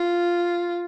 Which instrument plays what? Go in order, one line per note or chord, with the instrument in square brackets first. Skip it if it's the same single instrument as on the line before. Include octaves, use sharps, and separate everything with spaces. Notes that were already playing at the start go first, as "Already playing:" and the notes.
Already playing: [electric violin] F4